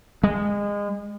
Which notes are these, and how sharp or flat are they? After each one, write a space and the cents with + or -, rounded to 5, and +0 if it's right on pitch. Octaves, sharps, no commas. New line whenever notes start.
G#3 -25